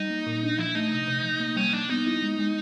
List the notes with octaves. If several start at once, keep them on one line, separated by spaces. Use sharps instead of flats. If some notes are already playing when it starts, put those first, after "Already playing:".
Already playing: G3 D#4
A#3
A#2
D4
F3 E4
A3 D#4
C3
C3
F3
A#3
G3 C#4
G3 D4
B3 D#4
E4
G#3
G#3